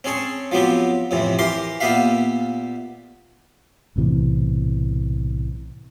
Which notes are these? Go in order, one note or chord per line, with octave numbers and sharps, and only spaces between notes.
C4 C#4 G#4 C#5 A5
F3 F#3 B3 C4 G4
F2 A2 C3 E3
E3 G4 A#4 C6 D6
A#2 A#3 B3 G4 E5 F5
B1 A2 C3 E3